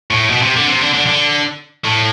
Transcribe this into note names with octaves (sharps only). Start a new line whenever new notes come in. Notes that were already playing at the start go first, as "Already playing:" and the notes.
A2
B2
C3
D3
C3
D3
D3
D3
A2